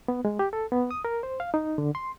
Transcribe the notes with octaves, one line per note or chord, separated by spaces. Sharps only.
B3
G#3
G4
A4
B3
D#6
A#4
C5
F5
D#4
D3
C6